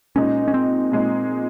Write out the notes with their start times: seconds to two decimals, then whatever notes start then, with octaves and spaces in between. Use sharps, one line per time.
0.16 A#2 G#3 C#4 D#4
0.48 C#4
0.54 C4
0.91 A#2 G#3 D#4